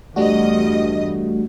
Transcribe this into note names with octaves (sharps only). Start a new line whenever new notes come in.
E2 G2 G3 A3 D4 F#4 D#5